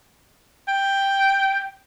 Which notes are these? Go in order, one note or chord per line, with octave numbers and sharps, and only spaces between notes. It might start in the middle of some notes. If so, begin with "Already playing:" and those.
G5